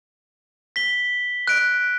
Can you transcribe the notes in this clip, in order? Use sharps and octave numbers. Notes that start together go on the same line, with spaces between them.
B6 G7
F#6 D7